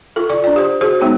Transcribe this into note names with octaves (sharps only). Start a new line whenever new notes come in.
F4 A4
F4 D5 C#6
D4 D5
G4 C5
F#4 G#4 C5
G#3 B3 D#4 C#5